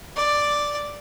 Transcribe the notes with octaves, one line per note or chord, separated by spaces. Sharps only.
D5